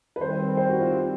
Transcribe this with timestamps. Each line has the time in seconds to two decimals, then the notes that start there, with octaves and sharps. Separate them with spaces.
0.16 B4
0.21 D#3 G3 C4 C5
0.57 C5
0.69 F#4
0.80 F4